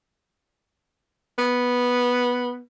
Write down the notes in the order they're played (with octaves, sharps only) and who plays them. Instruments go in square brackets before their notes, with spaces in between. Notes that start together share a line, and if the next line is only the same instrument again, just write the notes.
[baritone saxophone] B3